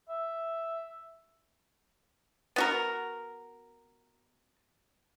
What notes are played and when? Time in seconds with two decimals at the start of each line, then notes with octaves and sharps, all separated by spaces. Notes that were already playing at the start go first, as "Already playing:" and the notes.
0.09 E5
2.56 B3 F#4 A#4